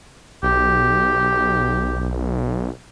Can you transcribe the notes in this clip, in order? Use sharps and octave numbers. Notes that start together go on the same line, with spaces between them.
B1 G4